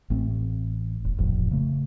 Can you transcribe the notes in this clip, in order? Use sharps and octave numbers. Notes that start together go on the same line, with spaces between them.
A1 A3 C4
E1
D#1 A1 F2
C#3 A3